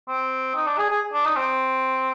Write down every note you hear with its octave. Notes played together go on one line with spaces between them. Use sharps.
C4
D#4
D4
G#4
G#4
D4
D#4
C4